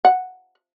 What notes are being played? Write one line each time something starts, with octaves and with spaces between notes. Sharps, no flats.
F#5